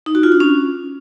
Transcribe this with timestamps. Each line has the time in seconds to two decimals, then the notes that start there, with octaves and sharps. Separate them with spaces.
0.06 D#4
0.15 F#4
0.23 F4
0.32 D4
0.40 C#4